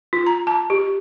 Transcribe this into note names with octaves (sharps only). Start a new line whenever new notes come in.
F4
A#5
A5
G4